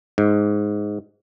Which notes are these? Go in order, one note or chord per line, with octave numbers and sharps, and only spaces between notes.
G#2